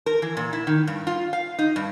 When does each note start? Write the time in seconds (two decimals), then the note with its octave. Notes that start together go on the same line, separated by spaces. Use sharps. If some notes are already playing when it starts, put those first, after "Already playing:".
0.06 A#4
0.22 E3
0.37 A#2
0.53 E4
0.67 D#3
0.87 G2
1.07 F4
1.33 F5
1.59 D#4
1.76 G2